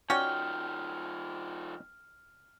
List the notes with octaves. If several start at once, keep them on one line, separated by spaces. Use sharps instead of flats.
F3 C#4 D#4 F#4 D5 G5 F6